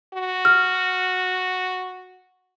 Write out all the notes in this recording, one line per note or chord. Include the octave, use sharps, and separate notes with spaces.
F#4
F6